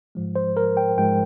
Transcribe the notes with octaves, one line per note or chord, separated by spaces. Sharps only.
G#2 F3 G#3
C5
A#4
G5
G#2 F3 G#3 G5